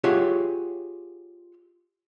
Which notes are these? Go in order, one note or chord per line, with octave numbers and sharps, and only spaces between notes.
F4 G4 G#4 C#5 E5 F#5